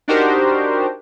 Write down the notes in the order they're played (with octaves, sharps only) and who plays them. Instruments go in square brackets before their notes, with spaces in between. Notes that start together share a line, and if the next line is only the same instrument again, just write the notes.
[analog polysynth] D4 D#4 F#4 G4 A#4 C5